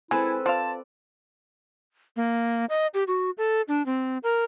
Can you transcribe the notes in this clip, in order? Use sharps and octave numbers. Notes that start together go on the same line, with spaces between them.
G#3 C4 E4 A4 B4 G#5
F4 C5 D5 F5 A5
A#3
D#5
G4
F#4
A4
D4
C4
A#4